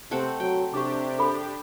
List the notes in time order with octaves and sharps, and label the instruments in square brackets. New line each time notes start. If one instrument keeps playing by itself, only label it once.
[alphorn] C3 [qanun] A3 C4 F#5
[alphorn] F#3 [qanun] G5
[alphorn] C3 [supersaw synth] D4 G4 [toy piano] C#6 D6
[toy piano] G#4 A4 B5